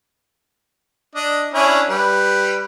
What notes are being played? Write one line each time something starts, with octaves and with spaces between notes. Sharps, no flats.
D4 D#5
C#4 D4 E4
G3 B4